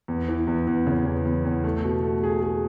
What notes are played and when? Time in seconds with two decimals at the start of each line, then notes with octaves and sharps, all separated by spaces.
0.08 E2
0.28 E3
0.47 E2
0.67 E2
0.87 C#3
1.06 E2
1.25 E2
1.45 E2
1.64 A3
1.84 B2
2.03 A3
2.23 G#4
2.42 G#4